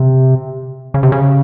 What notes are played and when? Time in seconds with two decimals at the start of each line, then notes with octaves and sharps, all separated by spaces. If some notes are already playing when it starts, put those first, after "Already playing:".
Already playing: C3
0.94 C#3
1.03 C3
1.12 C#3